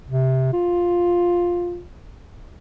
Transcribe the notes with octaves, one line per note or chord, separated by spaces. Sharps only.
C3
F4